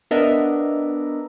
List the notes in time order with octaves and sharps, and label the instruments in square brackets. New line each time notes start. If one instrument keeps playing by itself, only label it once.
[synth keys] B3 D4 A#4 D#5 E5